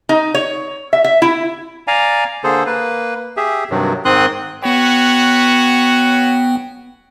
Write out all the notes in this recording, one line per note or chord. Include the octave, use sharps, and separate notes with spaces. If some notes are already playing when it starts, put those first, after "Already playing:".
D#4
C#5
E5
E5
E4
D5 F5 G#5 A#5
D3 A#3 G#4 A4 C5
A#3 B4
G4 G#4 E5
G2 C3 D#3 F#3
G#2 D#3 C4 C6 D#6 F#6
B3 F#4 B4 C#5 G5